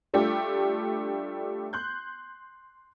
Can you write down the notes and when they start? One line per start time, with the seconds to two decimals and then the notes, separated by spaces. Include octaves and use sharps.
0.14 G3 A3 D4 F4 G4 A4
1.73 C6 F#6 G6